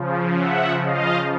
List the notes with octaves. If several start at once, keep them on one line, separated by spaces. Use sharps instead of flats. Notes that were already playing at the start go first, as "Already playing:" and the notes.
Already playing: C#3 F3
E5 F#5
D#5 F5